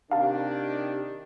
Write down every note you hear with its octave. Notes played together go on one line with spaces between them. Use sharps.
C3 D#3 D4 G4 F5 A5